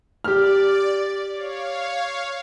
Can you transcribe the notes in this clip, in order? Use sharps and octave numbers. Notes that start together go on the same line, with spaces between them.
G4 D5 F6
C#5 F5